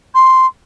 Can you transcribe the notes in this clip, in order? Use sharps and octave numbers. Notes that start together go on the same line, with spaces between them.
C6